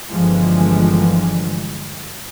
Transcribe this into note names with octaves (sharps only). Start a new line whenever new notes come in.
G1 D3 E3 F3 G#3